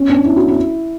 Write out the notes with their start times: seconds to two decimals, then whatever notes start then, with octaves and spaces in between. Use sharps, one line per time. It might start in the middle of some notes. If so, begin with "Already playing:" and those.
Already playing: C#4
0.10 D4
0.25 E4
0.36 F#4
0.48 E4